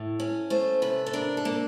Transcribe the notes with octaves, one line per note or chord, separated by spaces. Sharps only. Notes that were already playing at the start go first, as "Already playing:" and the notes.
Already playing: A2
C#4
A3 C5
C3 B4
A4
D4 A#4
A4
A#3